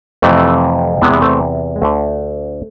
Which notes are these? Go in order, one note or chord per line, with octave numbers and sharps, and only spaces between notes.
F2 C3 E3 A3
E2 C3 E3 G#3 B3
B3
A3 C4
G#3
D2 D3 A3